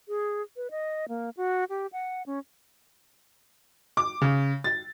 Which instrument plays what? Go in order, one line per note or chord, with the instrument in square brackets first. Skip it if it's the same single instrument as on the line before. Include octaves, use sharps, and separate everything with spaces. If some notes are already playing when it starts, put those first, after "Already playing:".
[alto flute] G#4
B4
D#5
A#3
F#4
G4
F#5
C#4
[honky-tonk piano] D6
C#3
A6